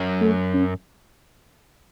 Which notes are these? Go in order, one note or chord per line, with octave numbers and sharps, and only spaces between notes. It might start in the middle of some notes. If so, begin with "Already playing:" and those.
Already playing: F#2
A3
C#4